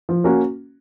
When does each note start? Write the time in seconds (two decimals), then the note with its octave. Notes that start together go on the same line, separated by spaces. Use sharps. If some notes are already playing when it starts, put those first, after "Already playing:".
0.09 F3
0.24 A#3 C#4 F#4